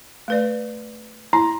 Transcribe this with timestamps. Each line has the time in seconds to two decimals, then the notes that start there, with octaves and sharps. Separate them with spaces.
0.28 A3 B4 D5
1.33 E4 A#5